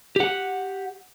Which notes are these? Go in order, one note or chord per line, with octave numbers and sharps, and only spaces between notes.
G4 F#5